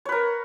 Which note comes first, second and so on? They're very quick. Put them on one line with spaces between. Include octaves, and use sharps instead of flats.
C#5 B4 A#4